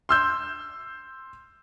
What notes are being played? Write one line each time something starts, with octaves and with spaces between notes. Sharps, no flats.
C6 E6 G6